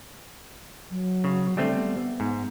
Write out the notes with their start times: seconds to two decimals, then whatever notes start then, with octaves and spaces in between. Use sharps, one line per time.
0.91 F#3
1.24 C#3
1.57 D3 G3 A3 C4
1.76 B3
2.20 G#2